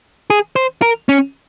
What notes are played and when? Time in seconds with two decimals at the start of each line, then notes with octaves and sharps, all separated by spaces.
0.30 G#4
0.56 C5
0.82 A#4
1.09 C#4